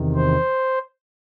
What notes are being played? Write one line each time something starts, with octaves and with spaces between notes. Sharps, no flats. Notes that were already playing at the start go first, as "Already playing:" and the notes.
Already playing: E2 C3 D#3
C5